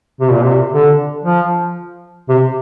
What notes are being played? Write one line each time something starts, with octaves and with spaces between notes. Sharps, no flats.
C3
A#2
C3
D3
F3
C3